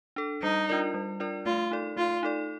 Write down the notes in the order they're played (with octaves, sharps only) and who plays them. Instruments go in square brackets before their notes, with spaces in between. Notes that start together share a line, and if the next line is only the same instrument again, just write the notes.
[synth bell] D4 A4
[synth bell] G3 [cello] D#4
[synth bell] D4 F4 A#4 D5
G3
D4 F4 A#4 D5
[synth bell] A3 [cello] F4
[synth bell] D#4 A4 D5
[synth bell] A3 [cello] F4
[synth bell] D#4 A4 D5